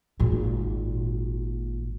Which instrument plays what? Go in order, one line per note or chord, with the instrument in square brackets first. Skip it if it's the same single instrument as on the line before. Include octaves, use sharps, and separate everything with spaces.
[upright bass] G#1 A#2